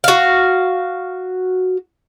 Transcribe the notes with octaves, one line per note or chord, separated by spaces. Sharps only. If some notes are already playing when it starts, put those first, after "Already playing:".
F#4 F5